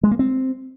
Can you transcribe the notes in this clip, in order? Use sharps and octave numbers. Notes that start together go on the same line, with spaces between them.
G#3
A#3
C4